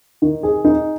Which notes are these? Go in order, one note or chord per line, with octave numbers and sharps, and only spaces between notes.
D#3
G#4
D#4